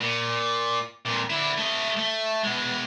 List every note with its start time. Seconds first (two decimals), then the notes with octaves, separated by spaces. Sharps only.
0.01 A#2
1.05 F2 A#2
1.30 D3 E4
1.57 A3 D#5
1.97 A3
2.44 B2 G#3